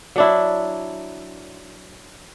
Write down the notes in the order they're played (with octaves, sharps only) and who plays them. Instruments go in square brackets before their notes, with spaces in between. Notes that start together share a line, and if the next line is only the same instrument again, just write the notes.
[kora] F#3 D4 E4